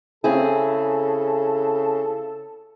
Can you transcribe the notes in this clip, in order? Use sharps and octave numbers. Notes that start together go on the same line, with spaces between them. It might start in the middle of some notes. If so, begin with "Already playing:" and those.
C#3 C4 E4 G#4 A4